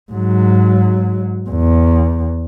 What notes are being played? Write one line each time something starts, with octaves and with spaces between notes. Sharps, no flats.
G#2 F#3
E2